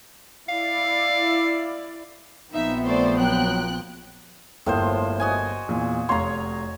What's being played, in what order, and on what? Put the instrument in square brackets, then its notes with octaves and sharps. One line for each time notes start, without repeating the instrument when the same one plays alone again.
[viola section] E4 D5 [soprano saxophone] F5
[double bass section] A#1 F3 [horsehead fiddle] B3 C4 [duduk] D#4 [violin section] E5
[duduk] A3 [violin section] C5 D5
[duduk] F#3 [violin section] G5 F#6
[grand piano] G1 A#3 [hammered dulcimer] A2 F3 C5
[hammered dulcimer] F#4 D#5 G#5
[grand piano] E2 A#2
[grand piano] F1 F5 C6 [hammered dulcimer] C#5 A#5